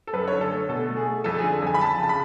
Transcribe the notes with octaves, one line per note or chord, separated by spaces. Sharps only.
A4
F#2 B4
C#5
D3
A4
A3
B2 A4
A3
G#4
A3
F2 A4
G#4
D3
A4
F2 G#5
B5
F2 A5
C#3 A5
B5